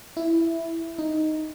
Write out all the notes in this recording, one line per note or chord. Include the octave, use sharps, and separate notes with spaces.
E4
D#4